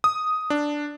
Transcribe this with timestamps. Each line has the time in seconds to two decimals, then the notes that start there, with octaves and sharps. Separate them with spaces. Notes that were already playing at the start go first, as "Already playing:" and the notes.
0.04 D#6
0.50 D4